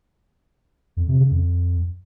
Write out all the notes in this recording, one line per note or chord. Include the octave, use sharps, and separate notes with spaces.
F2
C3
C#3
F2